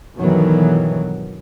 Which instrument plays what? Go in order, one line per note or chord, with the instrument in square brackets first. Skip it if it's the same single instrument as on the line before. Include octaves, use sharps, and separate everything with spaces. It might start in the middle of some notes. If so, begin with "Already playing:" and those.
[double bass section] G1 B2 D#3 E3 F#3